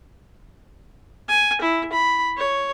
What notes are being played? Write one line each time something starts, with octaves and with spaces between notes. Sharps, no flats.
G#5
E4
B5
C#5